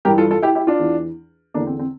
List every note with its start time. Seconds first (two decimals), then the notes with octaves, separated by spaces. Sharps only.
0.05 G2 E3 G4 A#4
0.18 F4 A4
0.31 F4 A4
0.42 E4 G4
0.55 E4 G4
0.67 D4 F4
0.79 E2 E3
1.54 E2 D3 A#3 D4
1.67 C4
1.79 C4